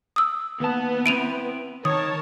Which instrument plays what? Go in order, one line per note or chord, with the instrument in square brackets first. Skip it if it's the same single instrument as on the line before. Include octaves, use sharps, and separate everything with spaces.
[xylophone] D#6 E6
[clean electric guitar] D#2 A5 [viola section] B3 B4
[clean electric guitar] C4 E4 [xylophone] D7 D#7 F7
[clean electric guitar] D#3 [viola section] A#4 C#5 A5 [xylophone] D#6